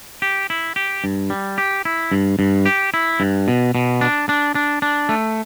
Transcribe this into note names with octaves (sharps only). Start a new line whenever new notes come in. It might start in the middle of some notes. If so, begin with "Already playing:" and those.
G4
E4
G4
G2
G3
G4
E4
G2
G2
G4
E4
G2
B2
B2
D4
D4
D4
D4
A3